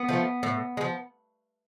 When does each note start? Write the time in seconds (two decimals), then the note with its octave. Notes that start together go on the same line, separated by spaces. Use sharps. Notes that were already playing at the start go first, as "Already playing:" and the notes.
Already playing: B3
0.09 F3 A3
0.43 A2
0.77 G#3
0.81 F3